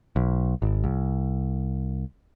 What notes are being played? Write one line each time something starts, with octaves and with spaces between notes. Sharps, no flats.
B1
G#1
C2